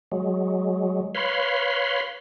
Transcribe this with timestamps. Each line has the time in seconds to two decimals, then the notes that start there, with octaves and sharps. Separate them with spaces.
0.12 F#3 G#3
1.15 B4 C#5 F5 B5 C6